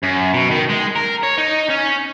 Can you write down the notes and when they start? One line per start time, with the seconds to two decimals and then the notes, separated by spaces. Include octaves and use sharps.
0.03 F#2
0.33 B2
0.50 D#3
0.69 G#3
0.96 A#4
1.23 C#5
1.38 D#4
1.70 C#4